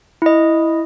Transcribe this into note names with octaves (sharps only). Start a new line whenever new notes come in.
E4 D#5